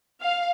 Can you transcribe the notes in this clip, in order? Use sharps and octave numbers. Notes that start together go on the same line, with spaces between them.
F5